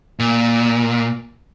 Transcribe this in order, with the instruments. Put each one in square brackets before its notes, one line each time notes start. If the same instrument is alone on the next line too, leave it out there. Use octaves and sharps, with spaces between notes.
[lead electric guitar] A#2